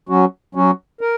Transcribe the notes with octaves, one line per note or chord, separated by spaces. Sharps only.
F#3 C#4 F#4
F#3 C#4 F#4
A#4